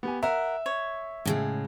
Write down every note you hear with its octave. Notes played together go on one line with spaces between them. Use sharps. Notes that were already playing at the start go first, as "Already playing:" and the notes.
B3 G4 G#5
A#4 E5 F#5
C#5
A2 C#3 G#3